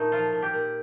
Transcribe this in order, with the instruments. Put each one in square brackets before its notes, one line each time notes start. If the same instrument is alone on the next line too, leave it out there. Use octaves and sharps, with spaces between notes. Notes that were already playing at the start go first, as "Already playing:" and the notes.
Already playing: [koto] A#2 A3 D#4
F3 F4
A#2
G4
A#2